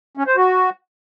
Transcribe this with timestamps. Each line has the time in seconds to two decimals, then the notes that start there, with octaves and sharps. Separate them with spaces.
0.17 C#4
0.27 C5
0.37 F#4